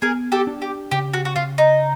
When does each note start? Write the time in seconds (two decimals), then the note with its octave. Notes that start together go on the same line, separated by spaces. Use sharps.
0.02 B3 G#4 A#4
0.32 G4 A4
0.47 D4
0.62 G4
0.91 C#3 G4
1.14 F#4
1.25 F#4
1.36 C#3 F4
1.58 D#4